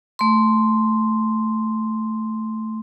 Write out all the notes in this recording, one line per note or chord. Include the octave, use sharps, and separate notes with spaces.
A3 C6